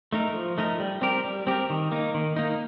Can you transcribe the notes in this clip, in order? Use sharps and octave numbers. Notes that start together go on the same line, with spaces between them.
A3 D#4 A#4
F3
A3 D#4 A#4
G3
C4 G4 A#4
G3
C4 G4 A#4
D#3
A#3 D#4
D#3
A#3 D#4